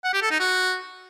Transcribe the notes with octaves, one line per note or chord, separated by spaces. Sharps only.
F#5
G4
A4
D#4
F#4